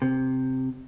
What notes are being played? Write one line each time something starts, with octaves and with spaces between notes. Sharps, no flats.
C3